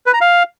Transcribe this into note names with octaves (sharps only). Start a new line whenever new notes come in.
B4
A#5
F5